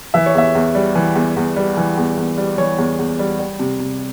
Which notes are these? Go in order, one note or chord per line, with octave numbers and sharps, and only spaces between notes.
E3 E5
C#5
E2 E5
E2
G3
E3
E2
E2
G3
E3
E2
E2
G3
E3 C#5
E2
E2
G3
G3
C3
C3